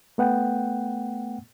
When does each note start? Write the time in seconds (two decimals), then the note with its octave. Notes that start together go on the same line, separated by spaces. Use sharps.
0.18 A3 B3 F#5 G5